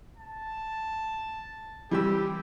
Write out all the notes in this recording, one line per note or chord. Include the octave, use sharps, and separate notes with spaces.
A5
E3 G3 G4 E6